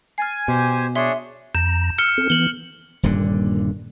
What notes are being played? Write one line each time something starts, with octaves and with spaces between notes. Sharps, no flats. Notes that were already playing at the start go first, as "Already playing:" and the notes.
G#5 F6 A6 C7
B2 G4 C5
D4 G#4 C#5 E5 C6
F2 A#5 G6 E7
E6 F6 C#7 G7
C4 A4
E3 B3 F#7 G7
D#1 G2 A#2 D3